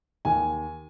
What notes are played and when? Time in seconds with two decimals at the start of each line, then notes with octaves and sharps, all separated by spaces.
0.25 D#2 G#5